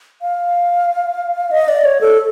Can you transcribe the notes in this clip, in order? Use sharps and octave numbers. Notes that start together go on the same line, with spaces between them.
F5
D#5
D5
C#5
A4